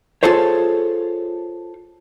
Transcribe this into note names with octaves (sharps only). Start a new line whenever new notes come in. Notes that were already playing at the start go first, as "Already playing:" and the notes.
F4 G#4 A4 C5 C#5